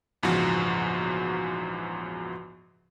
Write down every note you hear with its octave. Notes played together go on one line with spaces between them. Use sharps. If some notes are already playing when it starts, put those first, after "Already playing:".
A#1 E2 G#2 C#3 F3 F#4